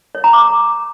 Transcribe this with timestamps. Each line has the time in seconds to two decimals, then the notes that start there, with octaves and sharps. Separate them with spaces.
0.15 C#5
0.24 A#5
0.33 D6